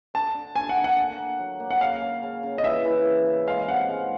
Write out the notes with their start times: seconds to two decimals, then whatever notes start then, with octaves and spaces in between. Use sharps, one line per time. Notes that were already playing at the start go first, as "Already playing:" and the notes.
0.14 D3 A5
0.35 D3
0.55 D3 G#5
0.69 F#5
0.77 A#3
0.84 F#5
0.98 D3
1.18 A#3
1.39 F#3
1.60 A#3
1.70 F#5
1.81 C#3 F5
2.02 C#3
2.23 C#3
2.43 C#3
2.58 D#5
2.64 E3 E5
2.85 E3
3.05 C#3
3.26 C#3
3.47 G#3 F5
3.68 C3 F#5
3.89 G#3